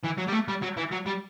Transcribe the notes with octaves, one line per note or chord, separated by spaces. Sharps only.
E3
F#3
G3
A3
G3
F#3
E3
F#3
G3